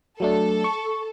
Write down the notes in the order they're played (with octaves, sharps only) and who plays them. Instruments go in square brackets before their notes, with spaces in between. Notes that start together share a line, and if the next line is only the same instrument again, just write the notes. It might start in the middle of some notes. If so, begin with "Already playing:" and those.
[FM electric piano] F#3 A3 D4 [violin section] A4
[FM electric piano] C#6